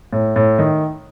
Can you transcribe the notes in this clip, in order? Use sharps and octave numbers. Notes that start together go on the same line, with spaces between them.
A2
A2
D#3